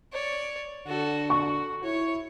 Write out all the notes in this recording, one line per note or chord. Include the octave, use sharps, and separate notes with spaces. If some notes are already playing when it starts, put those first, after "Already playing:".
C#5 D5
D3 F#4 A4
F#4 C#6
E4 C#5